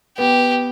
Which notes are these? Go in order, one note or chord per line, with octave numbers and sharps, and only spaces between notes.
B3 G4